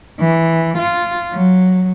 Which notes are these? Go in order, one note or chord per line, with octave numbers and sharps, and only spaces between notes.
E3
F4
F#3